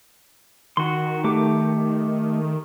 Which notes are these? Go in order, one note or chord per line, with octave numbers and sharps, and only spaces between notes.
D#3 F#4 C6
A3 G4 D6